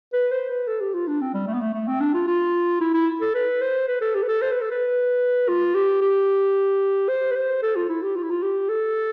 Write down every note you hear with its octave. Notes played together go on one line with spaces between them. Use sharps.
B4
C5
B4
A4
G4
F4
D4
C4
G3
A3
B3
A3
A3
C4
D4
F4
F4
E4
E4
A4
B4
C5
B4
A4
G4
B4
A4
C5
B4
A4
B4
F4
G4
G4
C5
B4
C5
A4
F4
E4
G4
F4
E4
F4
G4
A4